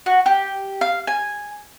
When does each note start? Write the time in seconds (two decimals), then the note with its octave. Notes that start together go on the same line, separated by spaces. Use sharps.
0.06 F#4
0.26 G4
0.81 F5
1.07 G#5